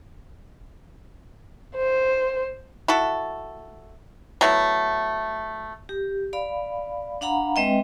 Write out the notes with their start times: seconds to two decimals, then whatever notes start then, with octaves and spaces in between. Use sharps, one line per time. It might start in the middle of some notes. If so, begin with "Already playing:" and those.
1.76 C5
2.88 E4 F#4 A4
4.41 F#3 A3 B3 E4
5.89 G4
6.33 D5 F5 B5
7.21 D4 F5 F#5 A#5 B5
7.56 G#3 C4 B4 D#5 E5 G5